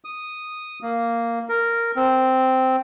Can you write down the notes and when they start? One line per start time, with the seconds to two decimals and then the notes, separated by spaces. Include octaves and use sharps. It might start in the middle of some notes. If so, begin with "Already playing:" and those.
0.05 D#6
0.82 A#3
1.49 A#4
1.96 C4